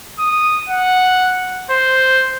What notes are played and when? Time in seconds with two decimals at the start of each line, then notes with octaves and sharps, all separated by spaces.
0.19 D#6
0.69 F#5
1.71 C5